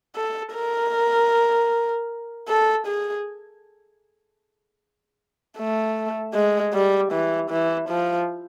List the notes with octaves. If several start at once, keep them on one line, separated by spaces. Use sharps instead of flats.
A4
A#4
A4
G#4
A3
G#3
G3
E3
E3
F3